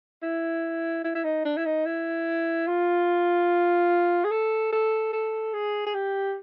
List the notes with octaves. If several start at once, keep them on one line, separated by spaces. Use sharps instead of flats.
E4
E4
E4
D#4
D4
E4
D#4
E4
F4
G#4
A4
A4
A4
G#4
G#4
G4